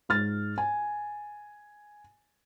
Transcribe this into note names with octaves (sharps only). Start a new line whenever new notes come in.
G#2 F6 A6
G#5